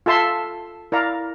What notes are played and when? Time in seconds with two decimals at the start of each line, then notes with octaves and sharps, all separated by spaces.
0.06 F4 A4 E5 A5 C6
0.92 E4 A#4 D5 F5 A#5